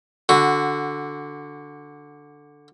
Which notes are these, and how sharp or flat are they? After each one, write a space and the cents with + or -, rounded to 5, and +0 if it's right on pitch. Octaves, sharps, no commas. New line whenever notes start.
D3 +0 F#4 +0